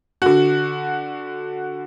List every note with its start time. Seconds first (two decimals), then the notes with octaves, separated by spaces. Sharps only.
0.22 D3 F#4